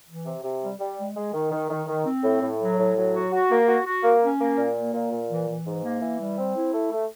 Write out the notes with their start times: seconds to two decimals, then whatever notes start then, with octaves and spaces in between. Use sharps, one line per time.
0.08 E3
0.26 C3
0.43 C3
0.63 G3
0.80 G3
0.98 G#3
1.16 G#3
1.33 D#3
1.52 D#3
1.70 D#3
1.88 D#3
2.06 C4
2.23 A2
2.42 A2
2.59 F#3
2.78 A2
2.95 F#3
3.14 F#4
3.32 F#4
3.50 A#3
3.68 F#4
3.86 F#4
4.03 A#3
4.22 C#4
4.40 A#3
4.58 A#2
4.76 A#3
4.94 A#2
5.12 A#2
5.30 E3
5.48 E3
5.66 G#2
5.84 A#3
6.02 E3
6.20 G3
6.38 C4
6.56 E4
6.74 A3
6.92 A3